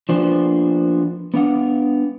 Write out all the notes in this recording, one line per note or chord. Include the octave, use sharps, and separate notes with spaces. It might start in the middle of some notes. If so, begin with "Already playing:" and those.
F3 A#3 B3 D4 C5
B3 D4 F5 F#5